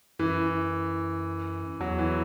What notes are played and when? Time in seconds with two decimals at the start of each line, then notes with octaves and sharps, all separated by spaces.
0.19 F#2 E3
1.80 E2 F#3
1.99 E3